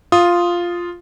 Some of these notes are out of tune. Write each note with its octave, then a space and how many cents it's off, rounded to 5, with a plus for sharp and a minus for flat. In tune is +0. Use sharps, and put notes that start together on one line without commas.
F4 +0 D#6 +0